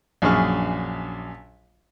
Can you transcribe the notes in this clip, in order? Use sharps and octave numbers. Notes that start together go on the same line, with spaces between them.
A#1 F#2 D4 G#4 C#6 F6